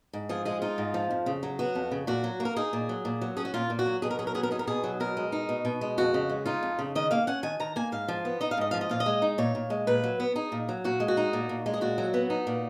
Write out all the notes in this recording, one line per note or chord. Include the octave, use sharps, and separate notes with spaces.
G#2
F3 G#4
G#3 G#4
D#4 F4
G#2
F3
F2
C#3
F#3
B3 F#4
F2
C#3
A#2 F#4
F#3
A#3
A#4
D#4 G#4
A#2
F#3
A#2
F#3
C#4 G#4
F#4
A#2 F4
A#2
F#4
F#3
B2 G#4
A#4
F#3 G#4
A#4
B3 G#4
A#4
D#4 G#4
A#4
B2 G#4
F#3
B2 A#4
G#3
D#4
B2
B2
G#3
F2 F#4
C#3
G#3
D#4 F4
F2
C#3
D#3 D#5
A#3 F5
C#4 F#5
D#3 G#5
D#3 A#5
A#3 G#5
G#2 F5
F3
B3
D#4 D#5
F5
G#2 D#5
F3 F5
D#5
A#2 F5
D#5
G#3
D#4
A#2 C#5
A#2
G#3
A#2 B4
F#3
B3
D#4 G#4
A#2
F#3
A#2 F#4
G#3
F#4
D#4
A#2
A#2
G#3
G#4
A#2 F#4
F#3
B3
D#4
A#2